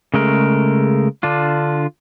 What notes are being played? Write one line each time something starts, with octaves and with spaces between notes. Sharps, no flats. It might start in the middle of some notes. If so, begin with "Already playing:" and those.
C#3 G#3 A3 A#4
D3 D4 F4